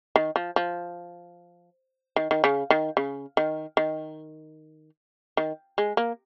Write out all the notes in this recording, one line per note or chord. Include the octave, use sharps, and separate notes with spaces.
D#3
F3
F3
D#3
D#3
C#3
D#3
C#3
D#3
D#3
D#3
G#3
A#3